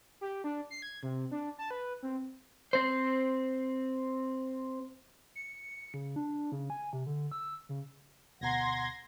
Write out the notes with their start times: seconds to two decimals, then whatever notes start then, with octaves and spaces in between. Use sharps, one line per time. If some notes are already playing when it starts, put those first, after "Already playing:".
0.21 G4
0.44 D4
0.70 C7
0.82 G#6
1.03 C3
1.31 D4
1.58 A5
1.71 B4
2.03 C4
2.73 C4 C5
5.35 C#7
5.94 C#3
6.16 D4
6.52 C#3
6.70 G#5
6.93 C3
7.06 D3
7.31 E6
7.69 C#3
8.41 D2 B2 F#5 A#5 C6 G#6 A#6